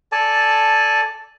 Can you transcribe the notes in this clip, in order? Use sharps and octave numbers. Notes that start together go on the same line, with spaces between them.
A4 D5 G#5 A5